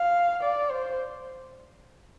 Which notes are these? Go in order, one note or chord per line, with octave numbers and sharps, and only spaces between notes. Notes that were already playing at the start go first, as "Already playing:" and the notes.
Already playing: F5
D5
C5